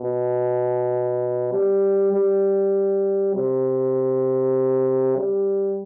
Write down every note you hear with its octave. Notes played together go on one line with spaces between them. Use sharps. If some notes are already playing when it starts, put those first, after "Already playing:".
Already playing: B2
G3
G3
C3
G3